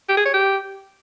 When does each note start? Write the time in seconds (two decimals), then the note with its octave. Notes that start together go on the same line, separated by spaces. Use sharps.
0.09 G4
0.17 G#4
0.26 C#5
0.34 G4